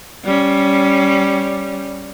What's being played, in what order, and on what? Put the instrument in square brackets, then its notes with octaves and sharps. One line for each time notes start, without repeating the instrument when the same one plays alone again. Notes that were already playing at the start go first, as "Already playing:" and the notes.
[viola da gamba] G3 C#4